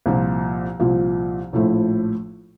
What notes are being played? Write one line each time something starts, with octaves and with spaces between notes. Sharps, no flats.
C2 A#2 F3
C2 A#2 F3
A#1 A2 F3 A3 E4